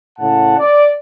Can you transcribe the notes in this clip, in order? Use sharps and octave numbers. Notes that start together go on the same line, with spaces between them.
A2 C#3 F#5 A5
D5